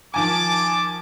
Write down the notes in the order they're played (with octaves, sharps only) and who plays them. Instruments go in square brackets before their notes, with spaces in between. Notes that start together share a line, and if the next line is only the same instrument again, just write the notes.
[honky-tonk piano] D#3 F3 G#5 [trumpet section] A5 D6